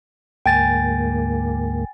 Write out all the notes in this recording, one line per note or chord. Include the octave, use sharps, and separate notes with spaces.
D2 G#2 A#3 G5 G#5 A6